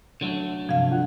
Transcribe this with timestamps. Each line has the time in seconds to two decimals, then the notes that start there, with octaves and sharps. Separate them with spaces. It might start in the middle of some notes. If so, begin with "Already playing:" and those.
0.21 D3 F#3 A3
0.69 G2 C3 F3 F5
0.91 D4 F4 F#5